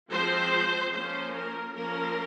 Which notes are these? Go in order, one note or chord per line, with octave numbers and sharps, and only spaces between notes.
F3 G#3 C4 C5
F3 A#3 C#4 C5
A#4
F3 A#3 C#4 A#4